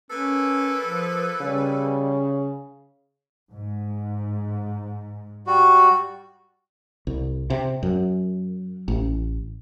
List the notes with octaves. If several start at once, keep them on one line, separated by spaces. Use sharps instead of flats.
A#3 C#4 A4 B4
F3
C#3 G3
G#2
G3 F#4
C2
C3
F#2
A1